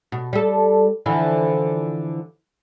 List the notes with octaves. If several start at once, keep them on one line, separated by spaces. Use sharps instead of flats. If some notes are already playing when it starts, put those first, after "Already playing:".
B2
G3 A4
D3 E3 F3